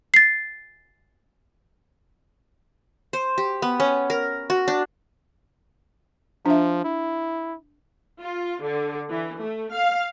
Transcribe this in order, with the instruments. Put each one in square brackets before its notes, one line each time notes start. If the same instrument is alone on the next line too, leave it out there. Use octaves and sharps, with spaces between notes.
[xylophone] A6 C7
[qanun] C5
G4
B3
C#4
A#4
F#4
D4
[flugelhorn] F3 [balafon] D4 E5
[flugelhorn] E4
[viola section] F4
D3
E3
A3
F5